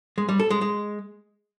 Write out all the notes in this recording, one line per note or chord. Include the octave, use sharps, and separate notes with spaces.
G#3
G3
A4
G#3
G#3